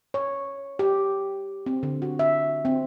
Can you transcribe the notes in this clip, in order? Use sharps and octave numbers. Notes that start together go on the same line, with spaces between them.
C#5
G4
C4
D3
F#4
E5
C4